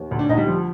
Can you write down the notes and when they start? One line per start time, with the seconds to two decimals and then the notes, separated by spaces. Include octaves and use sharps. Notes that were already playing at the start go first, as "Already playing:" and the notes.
Already playing: D#2
0.11 D2
0.19 D4
0.29 D2 D#4
0.37 G3
0.47 F3